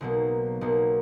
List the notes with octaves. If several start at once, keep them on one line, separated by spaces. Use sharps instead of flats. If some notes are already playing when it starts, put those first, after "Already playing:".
B1 B2 F#3 A#3
B1 B2 F#3 A#3